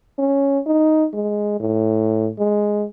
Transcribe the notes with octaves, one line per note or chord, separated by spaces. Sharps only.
C#4
D#4
G#3
A2
G#3